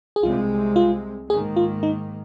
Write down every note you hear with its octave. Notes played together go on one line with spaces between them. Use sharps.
G#4
C2 C3 G#3 C4 F4
F4
G#2 D#3 A#3 G#4
F4
D#4